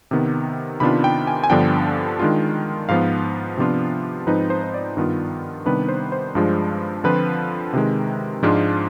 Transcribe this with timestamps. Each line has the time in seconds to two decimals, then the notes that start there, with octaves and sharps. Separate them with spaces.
0.11 C3 D#3 B3
0.80 C3 D#3 B3 D4 F4 B5
1.04 G5
1.27 G#5
1.44 G#5
1.50 G2 D3 F3 B3 D4 G5
2.19 D#3 G#3 D4 F4
2.89 G#2 F3 B3 F5
3.58 C3 F3 B3 D4 F4
4.27 G#2 F3 C4 D#4 B4
4.50 C5
4.64 C5
4.74 D5
4.97 G2 D#3 B3 F4
5.65 C3 D#3 G3 B3 D4 B4
5.88 C5
6.12 C5
6.35 G2 F3 G#3 D4 F4
7.04 D3 F3 C4 F4 B4
7.73 C3 D#3 G#3
8.43 G#2 F3 G#3 D4 F4